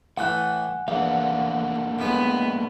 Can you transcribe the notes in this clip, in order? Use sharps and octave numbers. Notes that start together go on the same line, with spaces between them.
A2 E3 A3 F#5 G#5 F#6
E2 A3 A#3 D4 F5 F#5
A2 G#3 B3